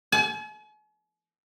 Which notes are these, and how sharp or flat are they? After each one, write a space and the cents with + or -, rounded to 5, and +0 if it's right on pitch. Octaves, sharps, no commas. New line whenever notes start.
G#5 +45